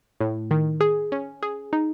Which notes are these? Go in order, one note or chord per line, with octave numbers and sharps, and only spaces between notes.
A2
D#3
G#4
C#4
G#4
D#4